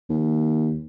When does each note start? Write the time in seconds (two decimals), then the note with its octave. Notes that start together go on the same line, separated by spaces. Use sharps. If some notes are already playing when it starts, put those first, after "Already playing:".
0.10 D#2